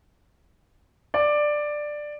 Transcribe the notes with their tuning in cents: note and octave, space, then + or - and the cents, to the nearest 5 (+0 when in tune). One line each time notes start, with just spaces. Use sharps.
D5 +10